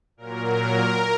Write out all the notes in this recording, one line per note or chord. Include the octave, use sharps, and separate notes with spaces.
A#2 F#3 A#4